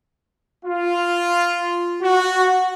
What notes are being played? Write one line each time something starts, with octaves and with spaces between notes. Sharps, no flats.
F4
F#4